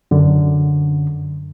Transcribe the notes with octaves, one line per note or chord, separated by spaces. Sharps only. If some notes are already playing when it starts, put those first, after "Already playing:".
F#2 D3